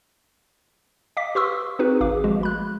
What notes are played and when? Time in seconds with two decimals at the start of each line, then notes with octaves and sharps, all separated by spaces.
1.17 D#5 F5 D6 B6
1.35 G4 B4 C6 C#6 D#6 E6
1.79 C4 D#4 F#4 G#4 B4
2.00 G#1 G#4 F5 D6
2.24 F3 G#3 F#4
2.41 G#3 B5 F#6